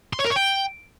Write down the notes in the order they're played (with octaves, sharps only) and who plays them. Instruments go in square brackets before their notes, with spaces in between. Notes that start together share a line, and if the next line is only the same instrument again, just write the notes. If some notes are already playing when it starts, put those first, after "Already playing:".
[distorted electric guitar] C6
C#5
A#4
C#5
G5